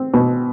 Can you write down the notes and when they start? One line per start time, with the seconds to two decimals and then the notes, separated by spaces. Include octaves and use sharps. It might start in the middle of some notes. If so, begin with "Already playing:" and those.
Already playing: C4
0.14 B2